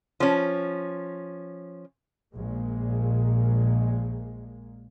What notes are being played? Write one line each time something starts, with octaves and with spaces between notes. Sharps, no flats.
F3 C#4
A#1 A#2 G#3 A#3